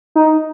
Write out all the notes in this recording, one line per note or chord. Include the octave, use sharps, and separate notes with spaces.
D#4